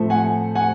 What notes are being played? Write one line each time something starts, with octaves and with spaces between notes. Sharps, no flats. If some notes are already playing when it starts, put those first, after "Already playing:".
Already playing: A2 F3 A3 C4
F#5 G#5
F#5 G#5